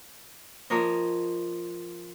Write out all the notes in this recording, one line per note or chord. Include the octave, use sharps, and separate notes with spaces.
F3 A#3 C#5 D#5